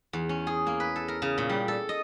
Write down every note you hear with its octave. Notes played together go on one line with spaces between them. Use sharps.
E2
C#4
G#4
A#3
B4
A4
A#4
C#3
A#2
G3
A4
D#5